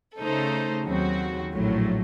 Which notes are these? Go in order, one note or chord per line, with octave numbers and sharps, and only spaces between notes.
C#3 A3 D#4 A4 C5
D#2 C#3 F#3 C4 F#4
A#1 A2 F#3 A3